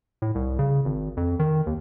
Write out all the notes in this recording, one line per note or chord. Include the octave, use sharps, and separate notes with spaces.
A2
C2
C#3
G#1
F2
D#3
D#2